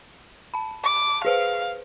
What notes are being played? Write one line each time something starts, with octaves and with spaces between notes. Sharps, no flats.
A5 B5
D6
G#4 B4 C5 F5